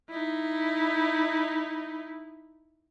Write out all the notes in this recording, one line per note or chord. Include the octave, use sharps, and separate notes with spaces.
D#4 E4